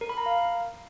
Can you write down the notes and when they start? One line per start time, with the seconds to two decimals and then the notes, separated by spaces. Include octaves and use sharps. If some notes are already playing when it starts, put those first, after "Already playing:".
0.01 A#4
0.09 B5
0.18 A#5
0.26 F5